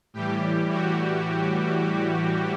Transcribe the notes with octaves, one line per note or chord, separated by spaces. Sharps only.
A2 E3 G3 G4
F#4